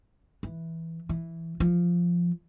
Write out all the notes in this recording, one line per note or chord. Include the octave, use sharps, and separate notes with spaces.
E3
E3
F3